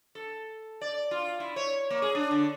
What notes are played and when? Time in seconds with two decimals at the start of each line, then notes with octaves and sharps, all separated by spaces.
0.15 A4
0.81 D5
1.11 F4
1.40 E4
1.56 C#5
1.90 A#3
2.02 G#4
2.15 D4
2.31 D3